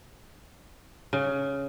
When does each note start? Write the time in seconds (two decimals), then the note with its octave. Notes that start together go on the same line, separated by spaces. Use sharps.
1.13 C#3